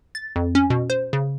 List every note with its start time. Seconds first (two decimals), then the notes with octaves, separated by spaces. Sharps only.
0.15 A6
0.36 F2
0.55 C#4
0.70 B2
0.90 C5
1.13 C#3